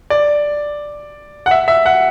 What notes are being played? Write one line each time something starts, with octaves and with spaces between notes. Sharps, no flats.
D5
F#5
E5
E5
F#5